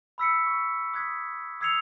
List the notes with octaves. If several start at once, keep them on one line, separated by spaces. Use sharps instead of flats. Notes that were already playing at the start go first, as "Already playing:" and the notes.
B5 E6 B6 C#7
C#6
D#6 F#6 G#6 B6
D#6 E6 G#6 C7 C#7 F7